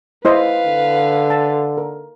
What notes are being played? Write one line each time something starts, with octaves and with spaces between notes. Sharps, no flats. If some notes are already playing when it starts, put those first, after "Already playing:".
E4 B4 C5 D#5 F5
D3
A5
A#4